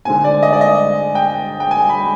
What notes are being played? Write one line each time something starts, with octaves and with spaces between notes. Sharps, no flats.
D3 G#3 C4 G#5
D5
D#5
D5
D#5
G5
G5
G#5
B5